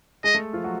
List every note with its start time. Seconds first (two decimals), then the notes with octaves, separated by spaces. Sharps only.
0.24 G#3 G#4 D#5
0.34 A3 A4
0.53 F3 F4
0.64 F#3 F#4